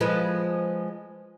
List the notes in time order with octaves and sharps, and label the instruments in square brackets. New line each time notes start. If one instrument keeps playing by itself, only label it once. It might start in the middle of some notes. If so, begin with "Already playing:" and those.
[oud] F3 G#3 B4